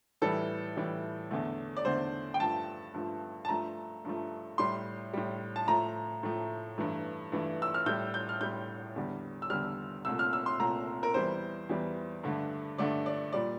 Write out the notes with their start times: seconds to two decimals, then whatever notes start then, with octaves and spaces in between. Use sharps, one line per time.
0.22 A2 E3 G3 A4
0.76 A2 E3 G3
1.31 E2 D3 A3
1.77 D5
1.85 E2 D3 A3 C5
2.34 G5
2.40 G2 F3 A3 A5
2.94 G2 F3 A3
3.45 A5
3.49 G2 F3 A3 A#5
4.05 G2 F3 A3
4.58 A2 G3 C6
5.14 A2 G3
5.56 A5
5.67 A2 F3 A3 A#5
6.23 A2 F3 A3
6.78 G2 E3 A3
7.32 G2 E3 A3
7.62 E6
7.74 F6
7.86 A2 G3 G6
8.14 G6
8.29 F6
8.41 A2 G3 G6
8.96 E2 D3 G3
9.42 E6
9.50 E2 D3 G3 F6
10.05 C2 A#2 A3 E6
10.19 F6
10.33 E6
10.46 C6
10.59 C2 A#2 A3 A#5
11.03 A#4
11.14 E2 E3 G3 C5
11.69 E2 E3 G3
12.23 G2 D3 A3
12.78 G2 D3 A3 D5
13.06 D5
13.33 A#2 G3 D5